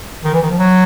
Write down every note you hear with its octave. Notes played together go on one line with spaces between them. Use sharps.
D#3
E3
D#3
F3
F#3